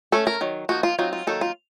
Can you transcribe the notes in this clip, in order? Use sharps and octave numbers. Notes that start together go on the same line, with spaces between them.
A3 C#4 A4
A#4
D#3 F#3
F3 A#3 D#4 F#4
F4
F#3 C4 D#4 F4
F4
D#3 F#3 A#3 D#4 A4
F4